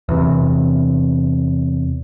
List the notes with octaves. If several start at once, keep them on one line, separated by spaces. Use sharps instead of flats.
E2 C3